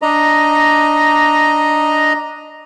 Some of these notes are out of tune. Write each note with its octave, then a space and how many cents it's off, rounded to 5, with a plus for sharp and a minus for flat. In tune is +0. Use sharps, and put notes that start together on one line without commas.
D4 +0 D#5 +0 A#5 +0